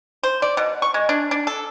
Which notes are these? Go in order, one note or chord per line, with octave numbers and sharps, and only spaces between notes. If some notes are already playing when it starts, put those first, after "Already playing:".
C5
D5
B2
C#6
G#3
D4
D4
A4